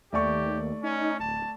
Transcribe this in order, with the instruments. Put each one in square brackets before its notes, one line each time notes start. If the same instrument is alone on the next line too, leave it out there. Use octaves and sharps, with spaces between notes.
[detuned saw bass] D#2 [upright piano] A3 D5 C#6 [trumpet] G4
[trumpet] C#4 [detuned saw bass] D#4
[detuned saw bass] D1 [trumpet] A5